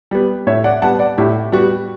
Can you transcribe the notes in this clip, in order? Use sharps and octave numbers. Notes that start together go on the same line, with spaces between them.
G3 B3
A2 C#5 E5
D5 F#5
G3 B3 F#5 A5
D5 F#5
A2 E4 G4
G3 B3 F#4